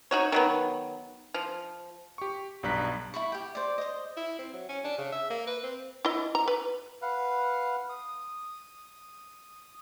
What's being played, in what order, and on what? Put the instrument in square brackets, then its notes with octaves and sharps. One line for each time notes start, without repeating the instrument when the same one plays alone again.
[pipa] D#4 F#4 C#5
D#3 F#3 B3
F3
[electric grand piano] G4 C#6
B1 G2 D4 A#5 F#6 B6
[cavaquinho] E4 B5 C#6
G4 G5
C5 D5
C5 D#5
[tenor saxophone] E4
C4
F#3
C#4
D4
C#3
E5
A#3
B4
C4
[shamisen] E4 D#5
A#5
B4
[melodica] B4 F5 F#5
D#6